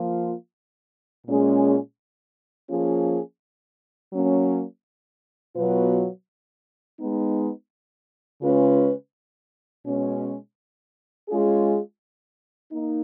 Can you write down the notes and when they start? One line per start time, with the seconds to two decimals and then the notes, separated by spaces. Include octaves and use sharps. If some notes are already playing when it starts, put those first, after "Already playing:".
Already playing: F3 A#3 F4
1.26 A#2 G#3 C#4 G#4
2.69 F3 A#3 C#4 F4 G#4
4.12 F#3 A#3 C#4
5.56 B2 F#3 B3 F4 B4
6.99 G#3 B3 D#4
8.41 C#3 G#3 C#4 F4 B4
9.86 B2 G#3 C#4
11.29 G#3 C#4 F4 G#4
12.71 A#3 D#4